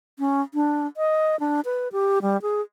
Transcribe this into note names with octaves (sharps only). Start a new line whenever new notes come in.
C#4
D4
D#5
D4
B4
G4
G3
G#4